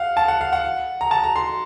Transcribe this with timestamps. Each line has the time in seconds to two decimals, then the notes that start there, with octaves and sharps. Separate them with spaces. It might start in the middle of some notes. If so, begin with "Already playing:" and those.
Already playing: F5 F#5
0.17 A5
0.28 F#5
0.41 F5
0.53 F#5
1.01 A#5
1.11 A5
1.24 A#5
1.36 C6